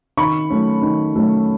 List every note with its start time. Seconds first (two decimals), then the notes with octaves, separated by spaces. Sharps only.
0.17 D#3 B5 C#6
0.50 F#3 A3 C#4
0.82 D#3
1.14 F#3 A3 C#4